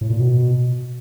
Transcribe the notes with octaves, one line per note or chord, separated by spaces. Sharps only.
A2
A#2
B2